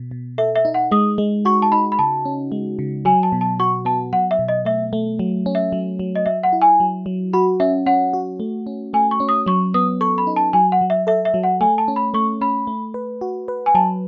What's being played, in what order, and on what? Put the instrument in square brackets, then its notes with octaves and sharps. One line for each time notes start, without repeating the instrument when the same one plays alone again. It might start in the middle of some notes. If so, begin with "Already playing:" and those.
Already playing: [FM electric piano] B2
B2
[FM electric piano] A4 [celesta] E5
[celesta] E5
[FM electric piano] D#4
[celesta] F#5
[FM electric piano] G#3 [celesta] D#6
[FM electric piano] G#3
[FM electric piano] F#4 [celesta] C#6
[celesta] A5
[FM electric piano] D#4 [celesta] B5
[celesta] B5
[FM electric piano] C#3 [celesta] A5
[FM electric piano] C#4
G#3
C#3
[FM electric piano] F#3 [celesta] G#5
[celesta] A5
[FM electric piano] B2
[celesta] A5
[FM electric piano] F#4 [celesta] C#6
[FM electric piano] B3 [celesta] A5
[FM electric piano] F#3 [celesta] F#5
[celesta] E5
[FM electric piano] B2
[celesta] D#5
[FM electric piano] A3 [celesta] E5
[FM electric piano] A3
F#3
C#4
[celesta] E5
[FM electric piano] F#3
F#3
[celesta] D#5
[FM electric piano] F#3 [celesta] E5
[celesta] F#5
[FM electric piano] E4
[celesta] G#5
[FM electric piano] F#3
F#3
[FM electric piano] F#4 [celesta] B5
[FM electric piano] C#4 [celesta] E5
[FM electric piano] C#4 [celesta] F#5
[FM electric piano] F#4
A3
C#4
[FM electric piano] A3 [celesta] G#5
[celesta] C#6
[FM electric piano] C#4
[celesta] D#6
[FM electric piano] F#3 [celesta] C#6
[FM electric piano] B3 [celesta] D#6
[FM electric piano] A4 [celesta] C#6
[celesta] B5
[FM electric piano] D#4
[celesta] A5
[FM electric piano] F#3 [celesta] G#5
[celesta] F#5
[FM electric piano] F#3
[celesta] E5
[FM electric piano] A4 [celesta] E5
[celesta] E5
[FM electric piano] F#3
[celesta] F#5
[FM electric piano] A3 [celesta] G#5
[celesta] A5
[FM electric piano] C#4
[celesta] B5
[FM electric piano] A3 [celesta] C#6
[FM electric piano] C#4 [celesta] B5
[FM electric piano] A3
B4
F#4
B4
[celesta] G#5
[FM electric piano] F#3 [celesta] A5